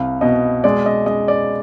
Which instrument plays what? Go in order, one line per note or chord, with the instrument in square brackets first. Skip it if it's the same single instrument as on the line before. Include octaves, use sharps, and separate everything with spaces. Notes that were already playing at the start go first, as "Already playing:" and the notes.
Already playing: [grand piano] C2 F5
B2 D#5
G#3 D5
D#5
G#3 D#5
D5